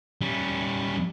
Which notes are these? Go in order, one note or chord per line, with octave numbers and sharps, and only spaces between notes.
G3 C#4